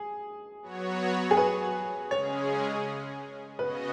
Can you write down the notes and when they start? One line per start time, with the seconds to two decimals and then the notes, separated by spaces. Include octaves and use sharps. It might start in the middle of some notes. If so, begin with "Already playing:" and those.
Already playing: G#4
0.62 F#3 B3 F#4 C#5
1.31 G#4
1.37 B4
2.11 C#3 G#3 C#4 G#4 C#5
3.59 C#3 B3 F#4 B4 D#5